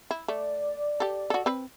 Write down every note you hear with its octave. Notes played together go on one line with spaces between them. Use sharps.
E4
A3 D5
G4 A4
F#4 A4
C4 B4